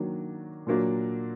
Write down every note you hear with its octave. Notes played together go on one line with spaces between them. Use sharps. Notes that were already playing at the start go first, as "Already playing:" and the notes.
Already playing: D#3 F#3 A#3 D4
A#2 F#3 A#3 D4